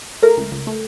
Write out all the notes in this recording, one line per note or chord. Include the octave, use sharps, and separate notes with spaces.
A3 A#4 A#5
C#2
C#2
A3